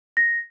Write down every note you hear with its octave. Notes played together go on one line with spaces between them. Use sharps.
A#6